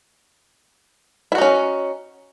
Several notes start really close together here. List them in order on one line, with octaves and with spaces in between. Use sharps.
E4 F#4 D#4 C#4